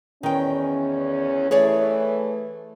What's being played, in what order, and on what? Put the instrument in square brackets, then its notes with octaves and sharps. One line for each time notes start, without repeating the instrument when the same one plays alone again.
[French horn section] E2 C#4 [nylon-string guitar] D#3 G5
[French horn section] E3 A3 [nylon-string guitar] G#4 C#5 D5